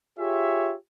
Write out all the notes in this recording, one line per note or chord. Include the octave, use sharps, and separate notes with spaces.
F4 G4 G#4 C#5 E5